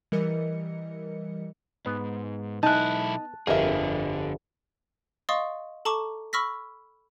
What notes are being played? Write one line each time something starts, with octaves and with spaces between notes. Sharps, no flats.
E3 G3 A#4 D#5 C#7
G#2 B3
B1 D#4 E4 A5 F#6
G1 F2 D3 G#4 A#4 E5
D#5 F5 C6 C#6 D#6 A6
A4 A5 A#5 C#6 D6 E7
B5 C#6 E6 F6 A#6 B6